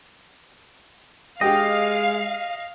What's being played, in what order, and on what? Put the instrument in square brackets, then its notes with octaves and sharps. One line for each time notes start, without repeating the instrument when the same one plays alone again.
[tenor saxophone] G#3 [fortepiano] G4 G5 [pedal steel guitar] D#5 [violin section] F5